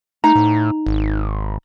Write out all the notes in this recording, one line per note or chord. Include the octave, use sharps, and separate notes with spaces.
A3 D#4 A#5
A2
G#1